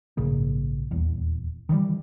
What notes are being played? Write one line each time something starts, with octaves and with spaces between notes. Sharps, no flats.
A#1 G#2 C#3 A#3
D#1 E2
D#3 E3 F#3 G3